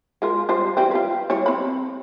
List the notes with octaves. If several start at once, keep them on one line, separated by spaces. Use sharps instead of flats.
G#3 F4 A#4
G3 F4 C5
E3 G3 C4
F4 B4
G3 E4 C#5
C4 B5